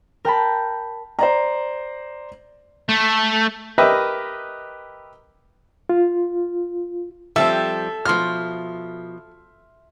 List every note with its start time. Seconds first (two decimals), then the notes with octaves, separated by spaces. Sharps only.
0.25 A#4 G5 A5 B5
1.19 C5 D5 A#5
2.89 A3
3.78 G4 A#4 B4 D#5 E5
5.89 F4
7.36 F3 G3 C4 A4 E5 E6
8.05 B2 F3 C6 F6